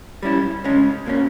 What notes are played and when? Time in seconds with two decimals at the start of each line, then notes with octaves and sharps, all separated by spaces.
0.23 G3 C#4 E4
0.64 C#3 G#3 C#4
1.06 B2 A#3 C#4